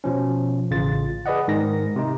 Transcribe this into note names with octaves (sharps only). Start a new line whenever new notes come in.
B2 F3 C#4
A1 C#3 F4 A6
G#4 B4 D5 D#5 F#5
G#2 D#3 A#6
C3 D#4